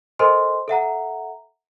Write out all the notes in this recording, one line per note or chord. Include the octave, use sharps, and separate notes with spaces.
A4 A#4 C5 D#5 G#5 C6
A4 E5 F#5 A#5